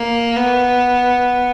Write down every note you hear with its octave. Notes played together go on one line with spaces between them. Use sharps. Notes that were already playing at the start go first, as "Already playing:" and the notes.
Already playing: A#3
B3